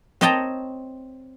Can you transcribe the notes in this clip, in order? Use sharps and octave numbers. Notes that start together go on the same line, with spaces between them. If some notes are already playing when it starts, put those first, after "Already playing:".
C4 C#5 D#5 G5 A5 A#5